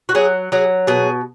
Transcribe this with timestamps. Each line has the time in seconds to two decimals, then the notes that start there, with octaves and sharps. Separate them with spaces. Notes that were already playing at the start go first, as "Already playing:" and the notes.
0.09 F#4
0.15 F#3 G#4
0.52 F#3 G#4
0.87 B2 G#4